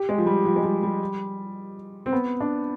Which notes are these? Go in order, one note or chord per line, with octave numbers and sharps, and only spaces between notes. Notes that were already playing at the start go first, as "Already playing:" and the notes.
Already playing: G4
G#3
F3
G3
F3
G#3
G3
G3
C4
B3
D4